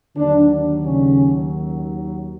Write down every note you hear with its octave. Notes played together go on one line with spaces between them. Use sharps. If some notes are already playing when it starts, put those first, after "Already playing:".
D#2 D3 D#3 F#3 D4
C#3 C#4